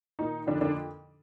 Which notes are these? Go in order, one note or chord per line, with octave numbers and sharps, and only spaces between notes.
A#2 D#3 D#4
F2 D3 D4
D3 D4